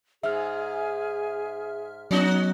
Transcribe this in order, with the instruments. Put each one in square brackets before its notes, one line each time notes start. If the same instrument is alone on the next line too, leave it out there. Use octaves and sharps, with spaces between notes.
[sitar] G#2 [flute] G#4 [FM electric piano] E5 F6
[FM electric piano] F#3 B3 [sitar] C#4 D#4 F#4